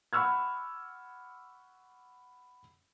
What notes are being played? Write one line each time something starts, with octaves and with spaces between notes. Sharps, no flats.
F#5 B5 C#6 E6 F6 G#6